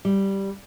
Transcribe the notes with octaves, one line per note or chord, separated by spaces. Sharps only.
G3